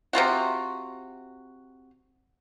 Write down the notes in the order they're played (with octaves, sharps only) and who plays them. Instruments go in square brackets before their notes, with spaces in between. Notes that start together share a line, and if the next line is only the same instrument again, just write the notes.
[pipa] C3 F3 F4 F#4